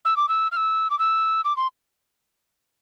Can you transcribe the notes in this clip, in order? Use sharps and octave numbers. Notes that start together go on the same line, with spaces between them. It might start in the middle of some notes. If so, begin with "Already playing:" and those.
E6
D6
E6
F6
E6
D6
E6
D6
C6